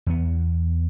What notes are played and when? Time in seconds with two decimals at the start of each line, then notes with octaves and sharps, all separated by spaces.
0.06 E2 B3